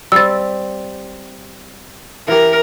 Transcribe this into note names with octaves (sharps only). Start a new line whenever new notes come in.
G3 C4 E6 A6
E3 G4 A#4